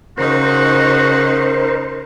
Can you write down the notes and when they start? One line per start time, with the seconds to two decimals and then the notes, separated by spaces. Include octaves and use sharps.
0.18 C#3 D#4 F#4 A#4 C5